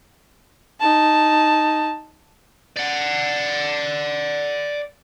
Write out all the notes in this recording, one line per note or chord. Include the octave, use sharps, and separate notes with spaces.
D#4 A5
D5 F#5